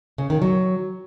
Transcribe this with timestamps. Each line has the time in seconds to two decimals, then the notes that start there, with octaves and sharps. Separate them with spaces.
0.18 C#3
0.30 D#3
0.42 F#3